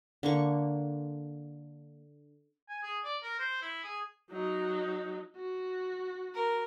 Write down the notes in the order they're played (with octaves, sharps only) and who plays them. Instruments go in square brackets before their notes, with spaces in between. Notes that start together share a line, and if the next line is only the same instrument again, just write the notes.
[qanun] D3 A#3 C#6
[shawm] G#5
G#4
D5
A#4
C5
E4
G#4
[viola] F#3 D#4
[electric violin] F#4
[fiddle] A#4